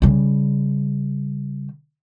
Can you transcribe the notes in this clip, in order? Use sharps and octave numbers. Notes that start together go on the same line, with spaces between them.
C#3 G3